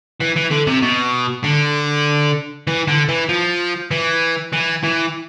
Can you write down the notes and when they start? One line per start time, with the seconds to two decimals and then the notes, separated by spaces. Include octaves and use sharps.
0.21 E3
0.37 E3
0.51 D3
0.67 C3
0.83 B2
1.44 D3
2.67 E3
2.88 D3
3.09 E3
3.29 F3
3.91 E3
4.53 E3
4.83 E3